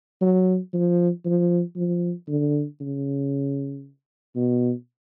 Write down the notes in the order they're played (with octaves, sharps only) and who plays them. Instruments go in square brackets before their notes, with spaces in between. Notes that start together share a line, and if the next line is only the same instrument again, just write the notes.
[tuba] F#3
F3
F3
F3
D3
C#3
B2